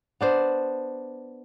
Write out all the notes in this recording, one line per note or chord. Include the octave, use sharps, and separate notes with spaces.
B3 D4 C5